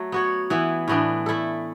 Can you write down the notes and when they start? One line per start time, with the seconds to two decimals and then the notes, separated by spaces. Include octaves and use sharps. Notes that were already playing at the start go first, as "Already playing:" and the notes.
Already playing: F#3 A3
0.12 B3 F#4 C#5
0.50 E3 B3 E4
0.88 A2 E3 B3 D4
1.26 A3 E4 A4